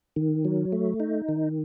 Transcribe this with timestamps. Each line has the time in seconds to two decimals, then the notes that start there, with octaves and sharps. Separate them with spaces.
0.16 D#3
0.45 F#3
0.72 A3
1.00 D#4
1.29 D#3